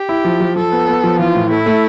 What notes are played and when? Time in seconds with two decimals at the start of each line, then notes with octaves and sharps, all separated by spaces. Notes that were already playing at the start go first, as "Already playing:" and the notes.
Already playing: G4
0.09 E4
0.25 F3
0.40 F3
0.56 F3 A4
0.72 B3
0.88 B3
1.04 F3
1.19 E3 F4
1.35 A2
1.50 A3 E4
1.66 A3